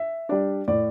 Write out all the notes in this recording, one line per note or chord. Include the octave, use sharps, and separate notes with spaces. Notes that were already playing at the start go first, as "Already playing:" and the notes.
Already playing: E5
G3 D4 D5
A2 D5